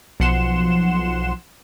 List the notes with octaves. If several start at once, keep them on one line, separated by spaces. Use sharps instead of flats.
B1 F3 F#5 C6 E7